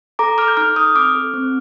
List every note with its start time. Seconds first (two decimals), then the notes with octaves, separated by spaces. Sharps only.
0.19 A4 A#5 D6
0.38 A4 D6 F6
0.48 G6
0.57 D#4 D6 F6
0.76 A4 D#6 G6
0.95 C4 D6 F6
1.15 A4
1.34 C4